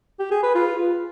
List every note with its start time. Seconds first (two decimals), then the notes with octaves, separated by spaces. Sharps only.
0.20 G4
0.31 G#4
0.43 B4
0.55 F4